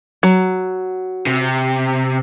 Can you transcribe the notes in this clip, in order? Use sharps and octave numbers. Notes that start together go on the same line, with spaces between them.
F#3
C3